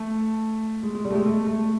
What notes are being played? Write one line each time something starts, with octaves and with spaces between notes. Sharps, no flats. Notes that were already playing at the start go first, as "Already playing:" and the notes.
Already playing: A3
G#3
G#3
G3
A3
G#3
A3
A3